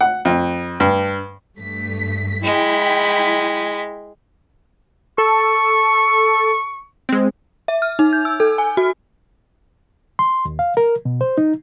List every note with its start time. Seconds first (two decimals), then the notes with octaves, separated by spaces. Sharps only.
0.01 F#5
0.25 F2
0.80 G2
1.57 G2 A3 B6
2.43 G#3 E4 G5 B5
5.18 A4 C#6
7.09 G#3 C4
7.68 E5
7.82 F6
7.99 D#4
8.13 G6
8.25 E6
8.40 A4
8.58 G#5
8.77 F#4
10.19 C6
10.45 D#2
10.59 F5
10.77 A#4
11.05 B2
11.21 C5
11.38 D#4